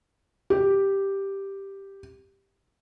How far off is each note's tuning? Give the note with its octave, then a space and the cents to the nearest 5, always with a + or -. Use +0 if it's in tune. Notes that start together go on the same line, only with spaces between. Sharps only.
G4 +0